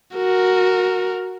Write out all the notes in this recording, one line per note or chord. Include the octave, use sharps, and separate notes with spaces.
F#4 A#4